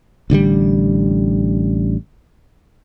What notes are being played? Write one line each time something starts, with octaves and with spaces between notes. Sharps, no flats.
A1 D3 F#3 G3